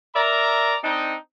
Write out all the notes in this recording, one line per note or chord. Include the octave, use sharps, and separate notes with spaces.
A#4 D5 E5 A#5
C4 D4 D#4